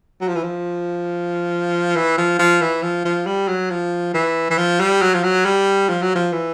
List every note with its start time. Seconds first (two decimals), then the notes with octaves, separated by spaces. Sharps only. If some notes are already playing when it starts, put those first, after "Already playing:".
0.21 F#3
0.28 F3
0.36 E3
0.43 F3
1.96 E3
2.17 F3
2.39 F3
2.61 E3
2.83 F3
3.05 F3
3.26 G3
3.48 F#3
3.70 F3
4.14 E3
4.50 E3
4.58 F3
4.80 G3
5.02 F#3
5.14 F3
5.23 F#3
5.46 G3
5.89 F3
6.02 F#3
6.15 F3
6.33 E3